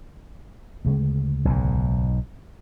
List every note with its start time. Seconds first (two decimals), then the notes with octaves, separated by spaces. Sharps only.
0.85 D2 C#3 G#3
1.45 B1 G#2